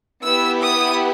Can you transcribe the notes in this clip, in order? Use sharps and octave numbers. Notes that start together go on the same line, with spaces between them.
B3 E4 G4 E6
D#6